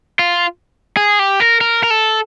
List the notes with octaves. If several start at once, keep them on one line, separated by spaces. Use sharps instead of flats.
F4
G#4
G4
A#4
A#4
A#4
A4